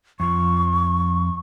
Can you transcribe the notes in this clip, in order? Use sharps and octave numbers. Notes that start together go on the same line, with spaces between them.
F2 F3 C#6